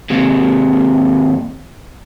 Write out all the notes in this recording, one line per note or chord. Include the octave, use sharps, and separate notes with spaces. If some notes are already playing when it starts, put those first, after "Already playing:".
D#2 C3